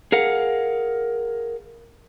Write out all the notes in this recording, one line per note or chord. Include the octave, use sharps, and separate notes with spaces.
G#4 A#4 F5 F#5